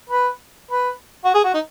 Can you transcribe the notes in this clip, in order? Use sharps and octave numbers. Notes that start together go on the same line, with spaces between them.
B4
B4
F#4
G#4
F#4
D#4